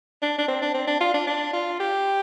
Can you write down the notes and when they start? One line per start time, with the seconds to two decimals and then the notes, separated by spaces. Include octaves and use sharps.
0.22 D4
0.38 D4
0.48 C4
0.62 D4
0.74 C4
0.87 D4
1.00 F4
1.14 D4
1.27 D4
1.53 F4
1.80 G4